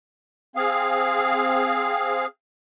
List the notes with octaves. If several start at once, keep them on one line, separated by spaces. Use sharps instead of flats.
C4 G#4 F5